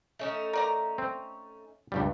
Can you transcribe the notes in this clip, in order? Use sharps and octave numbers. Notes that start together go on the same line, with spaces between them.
A3 C#4 D#4
A#4 D5 A#5
C4
C#2 G2 G3